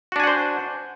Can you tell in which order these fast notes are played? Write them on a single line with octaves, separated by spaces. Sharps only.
F#4 D4 G#5 F#5 C5